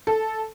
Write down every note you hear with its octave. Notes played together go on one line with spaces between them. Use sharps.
A4